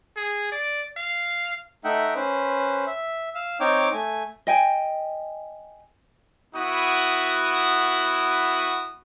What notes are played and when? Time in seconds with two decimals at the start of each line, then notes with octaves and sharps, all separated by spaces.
0.16 G#4
0.52 D5
0.97 F5
1.84 A3 D#4 E5 F#5 G5
2.15 C#4 B4 C5
2.87 E5
3.35 F5 E6
3.60 C4 D#4 C#5 G5 D6
3.93 A3 G#5
4.47 D#5 G5 G#5
6.55 B3 E4 F#4 D#6